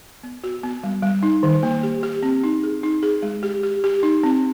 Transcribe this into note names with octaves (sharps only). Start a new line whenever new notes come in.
B3
F#4
B3
G3
G3
D#4
D#3
A#3
G4
G4
C4
D#4
G#4
D#4
G#4
G#3
G4
G4
G4
D#4
C4